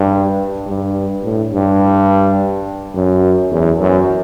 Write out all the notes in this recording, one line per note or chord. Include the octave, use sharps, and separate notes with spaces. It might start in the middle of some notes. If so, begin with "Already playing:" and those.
Already playing: G2
G2
A2
G2
F#2
E2
F#2